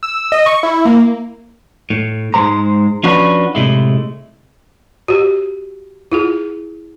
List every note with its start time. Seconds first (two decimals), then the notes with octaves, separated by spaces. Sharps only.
0.03 E6
0.32 D#5
0.46 C#6
0.63 E4
0.85 A#3
1.90 A2
2.34 G#2 C3 G#3 C5 A#5
3.03 F3 C#4 D4 F#4 B4
3.55 A2 C3 G#3 E4
5.08 F#4 G4
6.12 E4 F4 G#4